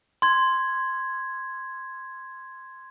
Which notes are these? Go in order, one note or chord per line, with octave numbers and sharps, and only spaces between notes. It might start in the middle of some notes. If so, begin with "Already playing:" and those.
C6 G#6